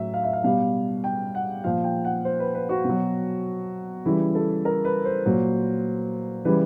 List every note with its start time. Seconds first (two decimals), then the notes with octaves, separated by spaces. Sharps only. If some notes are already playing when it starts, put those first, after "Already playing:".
Already playing: A2 F#3 E5
0.14 F5
0.24 E5
0.33 F5
0.44 B2 G3 F5
1.04 G5
1.35 F#5
1.64 A#2 F3 F5
1.84 G5
2.05 F#5
2.25 C5
2.40 B4
2.55 B4
2.69 F#4
2.84 B2
2.89 F#3
4.05 C#3 E3 G3 E4
4.35 A4
4.65 A#4
4.85 B4
5.05 C5
5.26 A#2 F#3
6.45 C#3 E3 G3 B4